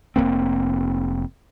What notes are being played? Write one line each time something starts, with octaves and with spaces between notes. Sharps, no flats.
F1 G#2 A#3 C4